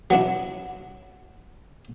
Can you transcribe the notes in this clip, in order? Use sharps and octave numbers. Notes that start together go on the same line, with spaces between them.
F#3 B3 D4 E4